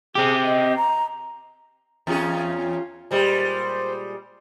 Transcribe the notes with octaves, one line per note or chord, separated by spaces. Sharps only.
C4 G4 G#4
D#5
A#5
E2 C#4 F4 G#4
A#2 G3 G#3 C5